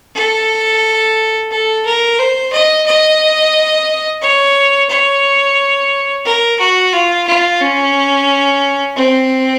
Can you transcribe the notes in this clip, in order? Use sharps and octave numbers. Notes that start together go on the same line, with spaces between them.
A4
A4
A#4
C5
D#5
D#5
C#5
C#5
A#4
F#4
F4
F4
C#4
C4